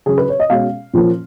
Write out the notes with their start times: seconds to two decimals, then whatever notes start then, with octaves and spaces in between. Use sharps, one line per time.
0.06 C#3 F#3 C#4 G#4
0.18 B4
0.29 C#5
0.40 D#5
0.50 B2 G#3 C#4 F5
0.94 A#2 F3 A#3 C#4